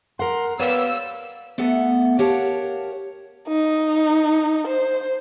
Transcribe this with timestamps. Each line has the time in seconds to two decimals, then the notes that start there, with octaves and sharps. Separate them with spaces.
0.19 A#4 F#5 C6
0.59 G3 A#3 B3 C#5 E6
1.58 A3 B3 A4 E5 F#5
2.19 G4 A#4 C#5 F5 F#5 A5
3.47 D#4
4.67 C5